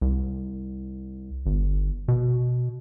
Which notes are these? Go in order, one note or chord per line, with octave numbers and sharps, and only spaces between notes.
C2
G1
B2